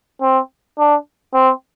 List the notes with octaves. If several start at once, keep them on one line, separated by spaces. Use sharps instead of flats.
C4
D4
C4